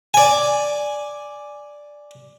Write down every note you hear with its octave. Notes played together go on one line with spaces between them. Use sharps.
D5 G#5